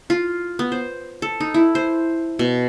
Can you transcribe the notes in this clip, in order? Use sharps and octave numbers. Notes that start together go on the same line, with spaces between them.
F4
B3
C5
A4
D#4
E4
C5
B2